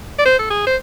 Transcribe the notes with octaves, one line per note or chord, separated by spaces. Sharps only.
D5
C5
A4
G#4
C5